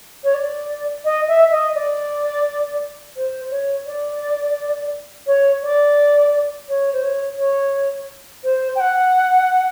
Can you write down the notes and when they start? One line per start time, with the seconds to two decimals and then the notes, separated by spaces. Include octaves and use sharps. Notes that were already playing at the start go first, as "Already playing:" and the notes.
0.24 C#5
0.34 D5
1.05 D#5
1.28 E5
1.51 D#5
1.75 D5
3.17 C5
3.51 C#5
3.87 D5
5.27 C#5
5.63 D5
6.69 C#5
6.92 C5
7.03 C#5
7.39 C#5
8.44 C5
8.75 G5
8.80 F#5